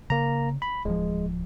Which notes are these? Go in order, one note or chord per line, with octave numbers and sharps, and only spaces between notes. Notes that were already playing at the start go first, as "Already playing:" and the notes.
C#3 A#3 A#5
B5
D1 F3 G#3